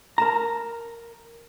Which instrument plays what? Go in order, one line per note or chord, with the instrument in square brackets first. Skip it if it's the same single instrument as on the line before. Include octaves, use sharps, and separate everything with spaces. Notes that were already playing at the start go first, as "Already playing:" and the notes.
[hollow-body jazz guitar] A#4 A5 A#5